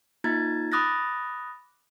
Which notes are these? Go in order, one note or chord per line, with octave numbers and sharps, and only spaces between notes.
A#3 D#4 F4 A#5 G#6 A6
B5 D6 D#6 F#6 A6 A#6